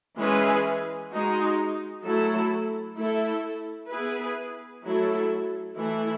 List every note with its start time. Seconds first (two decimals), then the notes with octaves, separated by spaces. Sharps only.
0.17 E3 G#3 C#4 G#4 B4
1.10 G#3 D#4 F#4
2.04 F#3 A3 E4 A4
2.97 A3 E4 A4
3.90 B3 E4 G#4 B4
4.84 F#3 A3 E4 A4
5.77 E3 A3 E4